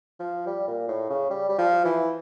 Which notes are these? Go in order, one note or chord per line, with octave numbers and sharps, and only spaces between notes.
F3
G3
A#2
A2
C#3
G3
G3
F3
E3